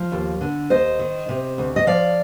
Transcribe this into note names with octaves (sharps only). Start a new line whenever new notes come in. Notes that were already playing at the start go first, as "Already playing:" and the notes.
Already playing: F3
D#2
D3
D#2 C5 D#5
D#3
C3
D2
D#5
F3 D5 F5